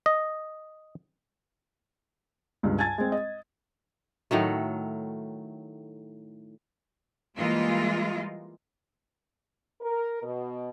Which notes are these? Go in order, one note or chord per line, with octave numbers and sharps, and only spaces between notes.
D#5
C#2 G2
G#5 A5 G#6 A6
G#3 C4
D#5
A2 D#3 F#3 A3
E3 G3 G#3 A#3 F4
A#4
B2